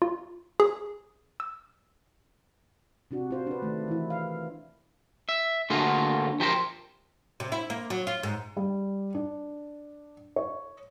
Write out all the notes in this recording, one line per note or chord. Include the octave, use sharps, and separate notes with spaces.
F4
G#4
E6
C3 D4 F#4
F4 C5
D4 B4
D#3 A3
E3 E4
F5
E5
D3 A3 A#3 F4 F#4 G#4
F3 G4 A#4 C5
C3
E4
A#3
F#3
F4
G#2
G3
D4
C#5